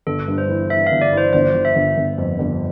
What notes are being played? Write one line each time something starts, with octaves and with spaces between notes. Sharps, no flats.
G1 A4
G2
C5
E3
E3 E5
F5
G1
D5
E3 C5
G1 C5
G1
E5
G1
G1
F2
G1